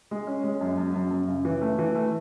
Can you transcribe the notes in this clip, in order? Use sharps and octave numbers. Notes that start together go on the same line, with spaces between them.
G#3
C#4
G#3
F#2
F#2
F#2
F#2
C#3
E3
A3
E3
A3